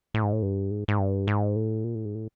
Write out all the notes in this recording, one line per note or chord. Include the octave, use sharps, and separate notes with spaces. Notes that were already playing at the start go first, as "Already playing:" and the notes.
A2
G#2
A2
G2
G#2
G#2
G2
G#2
A2
A#2
A2
G#2
A2